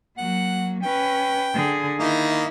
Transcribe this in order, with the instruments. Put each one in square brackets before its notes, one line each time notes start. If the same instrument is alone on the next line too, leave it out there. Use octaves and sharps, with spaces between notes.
[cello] F#3 A#3 [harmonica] F#5
[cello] C#4 B4 [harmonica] G5
[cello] D3 G#4
[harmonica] D#3 A#3 D#4 [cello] E4